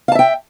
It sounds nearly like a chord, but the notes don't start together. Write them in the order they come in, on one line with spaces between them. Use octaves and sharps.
F5 A5 E5 G5